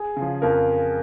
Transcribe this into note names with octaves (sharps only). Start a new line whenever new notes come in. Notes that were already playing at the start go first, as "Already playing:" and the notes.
Already playing: G#4
C#3 F3
F2 A#4